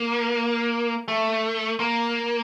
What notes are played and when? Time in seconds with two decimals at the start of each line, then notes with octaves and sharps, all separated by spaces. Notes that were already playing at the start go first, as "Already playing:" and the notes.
Already playing: A#3
1.08 A3
1.80 A#3